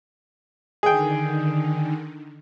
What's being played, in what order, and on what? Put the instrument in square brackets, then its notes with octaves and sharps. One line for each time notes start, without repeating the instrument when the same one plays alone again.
[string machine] D3 D#3 [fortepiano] G#4 G5